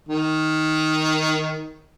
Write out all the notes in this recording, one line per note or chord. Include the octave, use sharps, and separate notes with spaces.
D#3